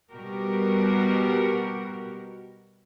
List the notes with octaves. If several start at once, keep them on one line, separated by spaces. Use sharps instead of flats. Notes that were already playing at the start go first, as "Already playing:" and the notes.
B2 G3 F#4 G4 A#4